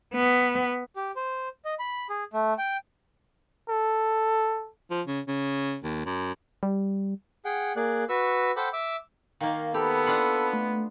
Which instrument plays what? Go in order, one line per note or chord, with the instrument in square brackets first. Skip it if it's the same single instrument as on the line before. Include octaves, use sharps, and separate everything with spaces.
[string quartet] B3
[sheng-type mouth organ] G4
C5
D#5
B5
G#4
A3
G5
[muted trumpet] A4
[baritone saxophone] F3
C#3
C#3
D#2
F#2
[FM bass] G3
[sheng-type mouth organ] G#4 F#5 G5
A#3 G#4 D5 F#6
F#4 B4 C#6 E6
A4 C5 F#5 G5 B5 D6
E5 D6 E6
[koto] D#3 A#3 [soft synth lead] F5
[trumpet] B3 [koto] G4 [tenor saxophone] A4 [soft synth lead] B5
[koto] D4 F4 F#5
[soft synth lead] A3